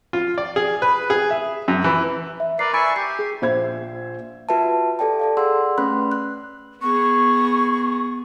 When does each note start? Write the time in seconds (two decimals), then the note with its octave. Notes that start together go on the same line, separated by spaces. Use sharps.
0.13 F4
0.38 D5
0.56 G#4
0.82 B4
1.10 G#4
1.30 E5
1.68 F#2
1.84 E3
2.40 E5
2.59 A#4 B4 D5 C7
2.73 E5 G#5 B5 C#6 A6 D7
2.96 G4 C7
3.19 G#4
3.42 A#1 C5 E5 G#6
4.49 F4 F#4 B4 E5 A5
4.99 G4 A4 D5 G5 A5
5.20 A4 D5 F5
5.37 G#4 D5 F#5 C6 E6
5.78 A3 C#4 B4 B5 C6 F#6
6.12 F#6
6.82 B3 G#4 C#6